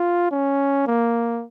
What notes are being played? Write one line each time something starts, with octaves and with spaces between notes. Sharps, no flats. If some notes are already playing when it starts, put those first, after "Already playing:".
Already playing: F4
C#4
A#3